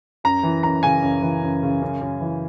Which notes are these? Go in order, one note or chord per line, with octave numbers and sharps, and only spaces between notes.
F#2 A#5
E3
F#2 A#5
C#3 G#5
F#2
E3
F#2
C#3
F#2
F#2
E3